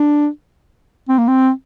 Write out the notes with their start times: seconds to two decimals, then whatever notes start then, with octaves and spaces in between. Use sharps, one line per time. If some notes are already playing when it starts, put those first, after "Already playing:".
Already playing: D4
1.09 C4
1.18 A#3
1.28 C4